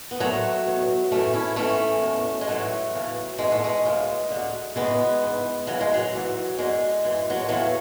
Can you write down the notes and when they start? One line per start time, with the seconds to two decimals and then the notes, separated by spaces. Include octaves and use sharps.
0.11 B3
0.20 D2 D3 F#3 A3
0.66 E2 B2
1.11 F#2 E3 A3 C#4
1.34 C#4 E4
1.56 G#2 E3 A3 C#4
2.02 E2 B2
2.41 G#3
2.48 G#2 E3 F#3 A3
2.93 E2 C#3 E3
3.39 G#2 E3 G#3
3.52 A3
3.64 G#3
3.85 D2 C#3 E3 G#3
4.30 D2 D3
4.75 F#2 C#3 E3 G#3 B3
5.22 G#2 E3
5.67 D2 C#3 E3 F#3
5.81 G#3
5.94 F#3
6.13 G#2 E3
6.57 F#2 D3 G#3
7.04 F#2 E3
7.30 F#3
7.39 G#3
7.49 E2 C#3 E3 F#3 A3